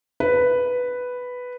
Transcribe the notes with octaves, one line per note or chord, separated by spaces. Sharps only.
B4